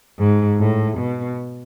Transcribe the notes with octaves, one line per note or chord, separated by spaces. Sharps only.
G#2
A2
B2